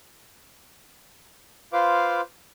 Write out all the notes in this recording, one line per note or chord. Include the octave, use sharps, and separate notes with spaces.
F4 B4 C5 F5 D6